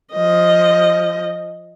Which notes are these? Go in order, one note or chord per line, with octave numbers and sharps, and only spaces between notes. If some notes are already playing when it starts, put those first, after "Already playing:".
F3 D#5